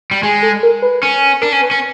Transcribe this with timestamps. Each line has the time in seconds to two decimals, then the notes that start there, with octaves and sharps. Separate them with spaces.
0.11 G3
0.23 G#3 G#4
0.42 A4
0.63 A#4
0.82 B4
1.03 C#4
1.42 D4 A#4
1.52 C#4
1.62 B4
1.71 C#4